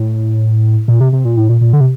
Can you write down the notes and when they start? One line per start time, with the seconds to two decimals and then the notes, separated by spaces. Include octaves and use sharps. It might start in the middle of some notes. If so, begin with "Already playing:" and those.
Already playing: A2
0.88 A#2
1.00 C3
1.13 C3
1.25 A#2
1.37 A2
1.49 A#2
1.61 A#2
1.73 D3
1.80 C3